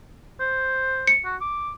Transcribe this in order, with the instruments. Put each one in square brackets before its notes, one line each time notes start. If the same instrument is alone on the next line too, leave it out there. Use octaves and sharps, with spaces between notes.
[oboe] C5
[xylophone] C#7
[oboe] F#4
D6